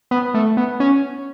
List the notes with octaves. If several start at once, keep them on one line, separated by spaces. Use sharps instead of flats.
B3
A3
B3
C#4